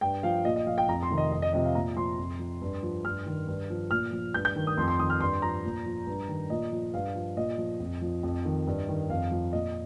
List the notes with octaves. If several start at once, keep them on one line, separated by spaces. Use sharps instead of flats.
G2 G5
F3 F5
A#2 D#5
D#5
F3 F5
G5
F2 A#5
C6
C3 D#3
D#5
F2 D#5
D#5
C3 F3 D#5
F5
A#2 A#5
F3 C6
F2
F3
G2
F3
G2 F6
D#3
G2
F3
A#2 F6
F3
G2 G6
G6
D#3
D#6
F2 C6
C6
D#3 D#6
F6
G2 C6
F3 A#5
A#2
F3
G2
D#3
A#2 D#5
F3
G2 F5
F3
A#2 D#5
F3
F2
F3
F2
D#3
G2
D#3
F2 F5
F3
A#2 D#5